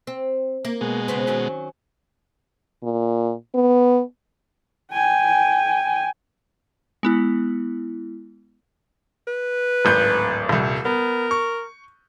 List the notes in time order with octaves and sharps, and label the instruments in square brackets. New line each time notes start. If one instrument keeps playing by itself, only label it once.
[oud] C4
A#3
[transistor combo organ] B2 G#3
[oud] C#3 B3 C4
D#3 F#3 C#4
[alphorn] A#2
B3
[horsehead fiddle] G5 G#5
[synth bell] G#3 B3 E4
[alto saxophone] B4
[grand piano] D1 G#1 G6
D#1 C2
[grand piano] B3 [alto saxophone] A#4
[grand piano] C#6